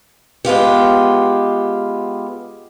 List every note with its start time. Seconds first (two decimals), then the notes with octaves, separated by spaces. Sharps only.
0.45 G#3 B3 F4 G4